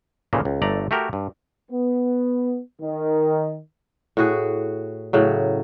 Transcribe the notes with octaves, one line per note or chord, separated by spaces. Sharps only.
D#2 A#2 C#3 E3 A3 A#3
C#2
G1 A3 D5 A#5
A3 F#4 G4 A#4
G2
B3
D#3
A2 F#4 G#4
A2 C#3 F#3